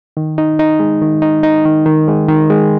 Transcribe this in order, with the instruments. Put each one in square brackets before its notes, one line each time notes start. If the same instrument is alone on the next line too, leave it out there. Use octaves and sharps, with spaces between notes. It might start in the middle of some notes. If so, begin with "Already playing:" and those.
[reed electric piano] D#3
D#4
D#4
G#3
D#3
D#4
D#4
D#3
D#3
G#3
D#3
G#3